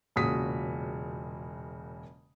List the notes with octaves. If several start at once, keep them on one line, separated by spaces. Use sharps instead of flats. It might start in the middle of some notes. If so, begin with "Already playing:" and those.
E1 A#2 C#3 F#4 D#6 B6